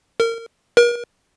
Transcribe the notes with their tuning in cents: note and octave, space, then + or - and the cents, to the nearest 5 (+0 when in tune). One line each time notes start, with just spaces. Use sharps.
A#4 -25
A#4 +40